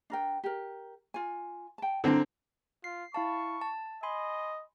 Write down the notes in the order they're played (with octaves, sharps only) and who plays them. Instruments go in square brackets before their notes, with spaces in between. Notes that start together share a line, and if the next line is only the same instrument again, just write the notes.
[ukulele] D4 A#4 G5
G4 A#4
F4 G#5
G5 A5
[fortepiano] D3 C4 [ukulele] D#4 A#4 A5
[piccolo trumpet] F4 [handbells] C7
[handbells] E4 F5 A5 [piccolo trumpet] C#6
[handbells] A5
[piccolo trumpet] D#5 [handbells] G#5 B5 C6